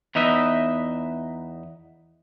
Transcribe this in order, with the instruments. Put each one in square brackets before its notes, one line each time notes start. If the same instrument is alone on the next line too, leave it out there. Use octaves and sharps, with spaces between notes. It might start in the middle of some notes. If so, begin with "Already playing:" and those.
[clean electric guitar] E2 D#4 B4 D#5 E5